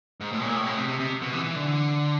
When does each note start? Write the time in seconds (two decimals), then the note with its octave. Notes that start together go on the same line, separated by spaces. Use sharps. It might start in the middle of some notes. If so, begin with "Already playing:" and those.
0.20 G#2
0.33 A2
0.40 B2
0.44 A#2
0.55 A2
0.66 B2
0.77 C3
0.89 C3
1.00 C3
1.22 B2
1.33 E3
1.44 E3
1.56 D3